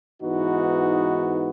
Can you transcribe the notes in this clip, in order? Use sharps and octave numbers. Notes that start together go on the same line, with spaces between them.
G#2 E3 B3 D#4 F#4